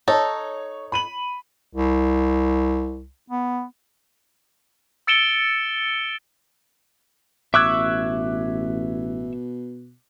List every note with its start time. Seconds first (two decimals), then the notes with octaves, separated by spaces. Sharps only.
0.08 D#4 A4 C#5
0.92 B5 D#7 F#7
1.74 C2
3.30 B3
5.07 E6 A6 C#7 D7 E7 G7
7.54 A1 B2 E5 C#6 D6 E6 F#6 G#6